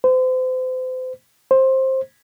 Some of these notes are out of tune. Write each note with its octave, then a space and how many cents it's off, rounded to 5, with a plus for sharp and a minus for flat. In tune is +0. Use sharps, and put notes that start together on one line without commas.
C5 -35
C5 +15